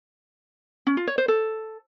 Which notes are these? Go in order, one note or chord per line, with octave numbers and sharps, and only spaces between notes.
C#4
F4
C#5
C5
A4